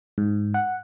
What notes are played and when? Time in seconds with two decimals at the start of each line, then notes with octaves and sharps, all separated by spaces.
0.18 G#2
0.54 F#5